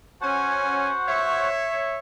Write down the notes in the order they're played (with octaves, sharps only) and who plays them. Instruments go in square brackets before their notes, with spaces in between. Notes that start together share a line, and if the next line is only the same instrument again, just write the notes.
[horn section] C#4 G#5 [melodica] F#4 C5 F#5
[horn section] C#5 E5